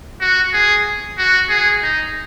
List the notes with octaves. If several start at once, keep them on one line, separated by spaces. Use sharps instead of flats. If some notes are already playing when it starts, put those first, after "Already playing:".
F#4
G#4
F#4
G#4
D#4